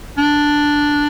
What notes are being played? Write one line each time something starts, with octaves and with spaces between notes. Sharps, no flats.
D4